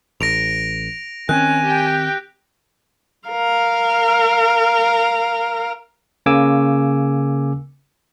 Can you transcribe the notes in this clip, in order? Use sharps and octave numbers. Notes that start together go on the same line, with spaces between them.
A1 A#6 D7 F7
D#3 C4 C#4 G#5 F#6
G4 G5
A#4 F5
C#3 A#3 G#5 D6 E6